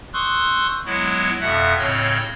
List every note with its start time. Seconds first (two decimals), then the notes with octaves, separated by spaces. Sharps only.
0.13 C6 C#6 D#6 E6 F#6 G6
0.86 F#3 G#3 B3 E4
1.40 F2 B2 E5 F#5 F#6
1.78 A2 C#3 C4 C#5 D#5 F6